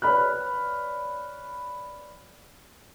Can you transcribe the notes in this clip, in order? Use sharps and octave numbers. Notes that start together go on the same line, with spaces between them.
B4 C#5 D5 B5 F6 F#6